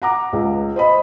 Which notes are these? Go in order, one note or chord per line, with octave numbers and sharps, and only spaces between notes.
F#5 A#5 D6
C#2
C5 D#5 B5